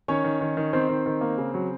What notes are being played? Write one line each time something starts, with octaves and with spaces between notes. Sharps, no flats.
D#3 C#4 C#5
D#3
D#3
D#3
D#3 C4 C5
D#3
D#3
A#3
C#3
F#3